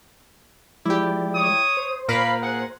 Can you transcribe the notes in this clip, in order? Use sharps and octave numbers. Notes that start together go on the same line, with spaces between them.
F3 G#3 E4 G4 D5
C#5 D#6
C5
A#2 A#3 A#4 B4 F5 B5
G#4 F#5